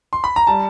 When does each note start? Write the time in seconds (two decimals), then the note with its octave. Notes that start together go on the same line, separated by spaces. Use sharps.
0.13 C6
0.24 B5
0.36 A#5
0.47 G3 A5